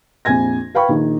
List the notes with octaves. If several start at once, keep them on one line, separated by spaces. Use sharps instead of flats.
A#1 F2 G#5 G#6 A#6
B4 F5 G5 B5 C#6
A#1 D#3